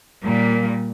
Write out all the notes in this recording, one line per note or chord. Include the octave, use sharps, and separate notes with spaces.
A#2 G3 A#3